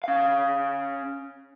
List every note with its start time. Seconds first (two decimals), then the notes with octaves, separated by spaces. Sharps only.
0.04 C#4 F5